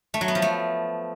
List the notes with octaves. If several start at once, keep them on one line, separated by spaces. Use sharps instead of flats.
A3
F#3
B3
F3
A3